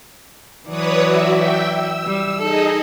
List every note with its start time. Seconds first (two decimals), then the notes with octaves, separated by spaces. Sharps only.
0.69 E3 F#3 B4 C#5 D5 D#6
1.03 F#4 E5
1.34 E5 G5 E6
1.75 E6
2.07 G3
2.39 D#4 G#4 A4 D#5